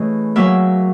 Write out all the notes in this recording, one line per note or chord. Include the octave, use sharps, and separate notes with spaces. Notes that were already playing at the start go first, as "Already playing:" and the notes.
Already playing: C#3 E3 A3 D#5
C#3 F#3 A#3 E5